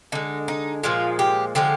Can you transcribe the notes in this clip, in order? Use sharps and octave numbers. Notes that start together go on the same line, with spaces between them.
D3 G#3 D#4
D#4
A#2 F3 G#3 F4
G4
D3 F3 G#3 G4